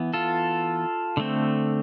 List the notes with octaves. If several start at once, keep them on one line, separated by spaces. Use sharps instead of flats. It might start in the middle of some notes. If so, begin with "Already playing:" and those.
Already playing: E3 B3
F4 A4
D3 A3 C4